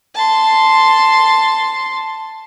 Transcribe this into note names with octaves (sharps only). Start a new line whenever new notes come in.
A5 C6